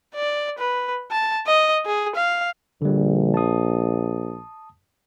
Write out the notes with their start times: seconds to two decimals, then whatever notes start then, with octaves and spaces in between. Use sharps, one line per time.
0.15 D5
0.58 B4
1.11 A5
1.47 D#5
1.86 G#4
2.16 F5
2.82 A#1 D3 G3
3.34 A5 D#6